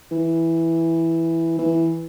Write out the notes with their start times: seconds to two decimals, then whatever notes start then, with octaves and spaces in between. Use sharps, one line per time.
0.11 E3
1.58 E3